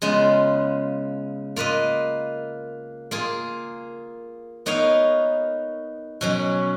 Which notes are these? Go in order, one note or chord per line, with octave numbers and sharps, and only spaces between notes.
C#3 G#3 B3 F4
A#3 F4 B4 D#5
A#3 F4 G#4
B3 D#4 A#4 C#5 F5
B2 F#3 C#4